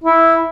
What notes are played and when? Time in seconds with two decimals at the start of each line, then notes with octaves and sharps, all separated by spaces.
0.04 E4